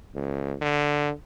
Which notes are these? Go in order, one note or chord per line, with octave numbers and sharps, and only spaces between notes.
C#2
D3